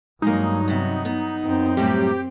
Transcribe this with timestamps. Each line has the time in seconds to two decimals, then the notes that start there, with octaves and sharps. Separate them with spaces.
0.22 G2 F#3 G#3 A#3 D#4
0.68 C3 B3
1.05 B3
1.45 F#2 C4
1.77 A2 F#3 G3 G4